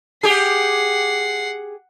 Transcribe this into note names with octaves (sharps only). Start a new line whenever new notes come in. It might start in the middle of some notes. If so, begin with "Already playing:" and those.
G4 G#4 F#5 C7